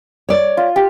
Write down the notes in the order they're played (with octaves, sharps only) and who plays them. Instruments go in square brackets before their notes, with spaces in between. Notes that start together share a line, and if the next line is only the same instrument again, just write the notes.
[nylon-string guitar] C#5 D5
[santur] F4
G4